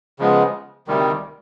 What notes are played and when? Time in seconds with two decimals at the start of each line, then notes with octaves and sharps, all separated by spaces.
0.19 C#3 F3 G#3 B3
0.87 D2 C3 D#3 G3